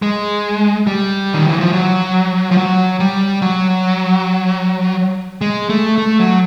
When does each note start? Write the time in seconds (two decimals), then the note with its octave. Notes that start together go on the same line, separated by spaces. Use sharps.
0.02 G#3
0.87 G3
1.34 D#3
1.47 E3
1.60 F3
1.72 F#3
2.51 F3
2.57 F#3
3.00 G3
3.42 F#3
5.41 G#3
5.69 A3
5.98 A3
6.19 F#3